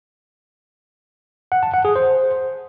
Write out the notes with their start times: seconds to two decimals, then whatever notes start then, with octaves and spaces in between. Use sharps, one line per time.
1.52 F#5
1.63 A5
1.74 F#5
1.85 G#4
1.96 C5